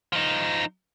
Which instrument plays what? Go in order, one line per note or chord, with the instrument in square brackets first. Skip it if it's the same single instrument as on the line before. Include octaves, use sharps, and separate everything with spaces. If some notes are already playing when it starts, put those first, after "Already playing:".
[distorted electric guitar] F3 D#4